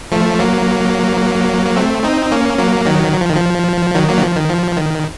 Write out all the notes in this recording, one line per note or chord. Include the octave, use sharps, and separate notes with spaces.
F3 A3
F#3 A#3
A#3
A3 C4
C4 D#4
A#3 C#4
F#3 A#3
D#3 F#3
F#3
F3
D#3
F3
D#3 F#3
F#3 A#3
D#3
F3
D#3
F3
D#3